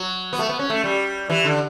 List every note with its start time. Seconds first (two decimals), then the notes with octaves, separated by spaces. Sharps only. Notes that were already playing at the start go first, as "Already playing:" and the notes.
Already playing: F#3
0.33 B3
0.39 A3
0.49 B3
0.59 C#4
0.70 A3
0.84 G3
1.30 E3
1.44 D3